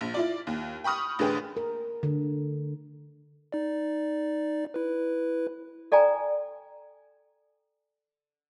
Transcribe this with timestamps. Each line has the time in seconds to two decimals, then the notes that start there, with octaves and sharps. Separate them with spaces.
0.01 A#1
0.14 E4 F4 D5
0.47 D#2
0.84 G5 B5 C#6 D#6 F6
1.19 A1 D3 G#4 B4 G5
1.57 A#4
2.03 D3
3.52 D#4 D5
4.74 E4 B4
5.92 A4 D5 G5 G#5 A#5